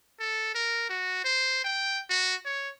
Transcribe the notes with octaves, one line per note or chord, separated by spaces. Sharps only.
A4
A#4
F#4
C5
G5
F#4
C#5